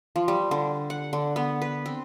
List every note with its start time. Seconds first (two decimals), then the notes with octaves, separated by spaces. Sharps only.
0.16 F3
0.28 G3
0.51 D3
0.90 F#5
1.13 D3
1.36 B3
1.62 B4
1.86 C4